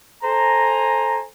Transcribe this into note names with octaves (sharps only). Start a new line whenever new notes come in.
A4 C5 G#5 A#5